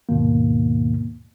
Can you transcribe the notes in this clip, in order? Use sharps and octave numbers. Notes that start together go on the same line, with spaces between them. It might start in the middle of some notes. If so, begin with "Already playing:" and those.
D#2 G#2 B2 D#3 A#3